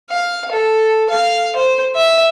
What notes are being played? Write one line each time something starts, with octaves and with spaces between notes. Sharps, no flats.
F5
A4
F5
C5
E5